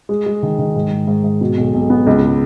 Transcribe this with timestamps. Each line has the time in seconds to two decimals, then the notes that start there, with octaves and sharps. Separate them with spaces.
0.09 G#3
0.26 G#3
0.43 D#3
0.59 D#3
0.75 G#2
0.91 G#2
1.07 G#2
1.24 G#2
1.41 B2
1.58 B1
1.74 B1
1.90 B3
2.07 C#2
2.23 G#3